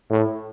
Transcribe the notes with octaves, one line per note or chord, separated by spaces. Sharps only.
A2